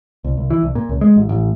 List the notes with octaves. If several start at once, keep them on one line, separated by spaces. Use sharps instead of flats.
C2
C2
E3
C2
A#2
C#2
G#3
A1
A1